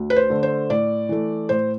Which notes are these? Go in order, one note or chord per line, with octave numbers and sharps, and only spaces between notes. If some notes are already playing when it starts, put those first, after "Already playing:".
Already playing: D2
B4
C5
D3 A3
C5
A2 D5
E3 A3
A2 C5